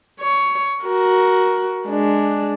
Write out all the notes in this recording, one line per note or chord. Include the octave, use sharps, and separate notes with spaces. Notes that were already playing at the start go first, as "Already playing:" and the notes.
C#5
F#4 A#4
G#3 D4